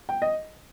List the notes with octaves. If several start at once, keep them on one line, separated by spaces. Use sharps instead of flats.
G5
D#5